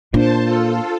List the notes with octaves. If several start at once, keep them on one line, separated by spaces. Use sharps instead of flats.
A#2 D4 C5 A5
F4 A4